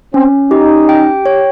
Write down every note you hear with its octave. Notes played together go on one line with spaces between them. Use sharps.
C4 C#4
D#4 G4
G5
C#5